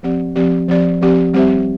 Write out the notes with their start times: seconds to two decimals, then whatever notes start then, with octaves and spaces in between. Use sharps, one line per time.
0.03 F3 C4 G4 D5
0.36 F3 C4 G4 D5
0.68 F3 C4 G4 D5
1.02 F3 C4 G4 D5
1.33 G3 C4 G4 C5 E5